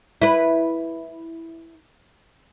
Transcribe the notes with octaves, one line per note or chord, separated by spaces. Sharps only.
E4 B4